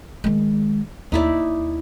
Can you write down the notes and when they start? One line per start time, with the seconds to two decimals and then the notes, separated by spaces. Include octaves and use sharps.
0.24 D#3 G#3
1.12 D#2 D#4 E4 D5